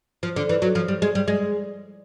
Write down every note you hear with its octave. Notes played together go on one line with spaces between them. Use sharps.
F3
D3
E3
F#3
F3
G3
G#3
G3
G#3